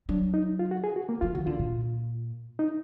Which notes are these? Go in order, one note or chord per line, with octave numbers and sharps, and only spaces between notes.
F#3 D4
D#4
F4
F#4
G#4
F#4
A#3
F3 F4
D#3 F#4
D3 F4
A#2
D#4